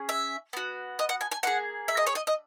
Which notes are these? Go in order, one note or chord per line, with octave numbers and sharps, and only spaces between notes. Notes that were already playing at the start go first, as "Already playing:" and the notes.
Already playing: C#4 G#4
E5
B3 F#4
D#5
F#5
G#5
G#5
A#3 E4 G#4 F#5
E5
D#5
C#5
D#5
D#5